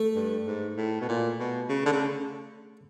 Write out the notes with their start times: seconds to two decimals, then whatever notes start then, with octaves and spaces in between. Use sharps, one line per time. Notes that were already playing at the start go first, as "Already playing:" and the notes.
Already playing: A3
0.15 G2
0.47 G#2
0.77 A2
1.01 B2
1.09 A#2
1.39 B2
1.69 C#3
1.86 D3
1.92 C#3